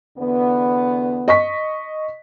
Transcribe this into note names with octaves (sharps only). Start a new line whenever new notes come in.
E2 D3 B3
D#5 C#6 B6